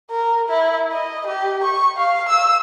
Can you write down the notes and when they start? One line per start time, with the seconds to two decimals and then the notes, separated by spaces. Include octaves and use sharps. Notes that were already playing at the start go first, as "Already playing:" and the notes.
0.11 A#4
0.49 E4
0.92 D#5
1.27 G4
1.64 C#6
1.97 F5
2.29 E6